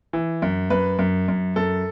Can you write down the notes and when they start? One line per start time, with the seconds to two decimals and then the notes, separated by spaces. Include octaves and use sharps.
0.13 E3
0.42 F#2
0.70 F#2 B4
0.99 F#2
1.28 F#2
1.56 F#2 A4